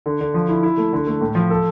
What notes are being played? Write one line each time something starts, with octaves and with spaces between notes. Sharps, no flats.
D3
D3
F3
E4
E4
A3
D3
A3
A2
F3
A4